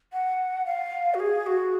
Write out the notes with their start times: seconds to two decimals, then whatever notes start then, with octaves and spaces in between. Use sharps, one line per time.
0.13 F#5
0.66 F5
1.14 F#4
1.20 G#4
1.47 F#4